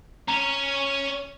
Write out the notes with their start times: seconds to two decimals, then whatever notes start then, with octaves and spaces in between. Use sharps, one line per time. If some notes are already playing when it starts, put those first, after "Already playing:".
0.28 C#4 C#5 A#5